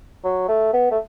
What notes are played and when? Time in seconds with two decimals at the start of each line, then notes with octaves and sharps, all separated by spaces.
0.24 F#3
0.48 A3
0.73 B3
0.91 A3